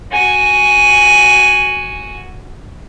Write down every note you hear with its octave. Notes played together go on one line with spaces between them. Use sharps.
F#4 G#5